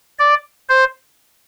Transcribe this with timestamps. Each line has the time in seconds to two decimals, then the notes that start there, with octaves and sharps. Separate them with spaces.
0.19 D5
0.69 C5